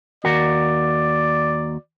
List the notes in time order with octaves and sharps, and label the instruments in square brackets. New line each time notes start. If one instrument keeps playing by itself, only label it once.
[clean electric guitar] D#2 F#4 A#4 [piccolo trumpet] D5